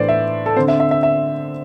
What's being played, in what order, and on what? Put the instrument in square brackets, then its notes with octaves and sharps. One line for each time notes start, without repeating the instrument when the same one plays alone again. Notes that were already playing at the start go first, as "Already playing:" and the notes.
Already playing: [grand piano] A2 E3 A3 D4 C5 D5
E5
A4
D3 C4 C5
E5
E5
E5
E5